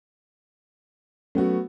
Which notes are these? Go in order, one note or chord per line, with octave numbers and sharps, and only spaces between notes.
F#3 A3 B3 C#4 F#4